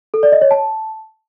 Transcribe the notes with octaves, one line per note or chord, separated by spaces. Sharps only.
A4
D5
D#5
C#5
A5